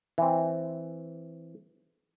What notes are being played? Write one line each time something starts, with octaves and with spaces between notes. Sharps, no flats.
E3 C4